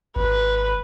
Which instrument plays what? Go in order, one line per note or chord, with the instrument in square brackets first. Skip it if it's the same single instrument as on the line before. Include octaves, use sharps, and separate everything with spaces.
[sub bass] G#1 [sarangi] B4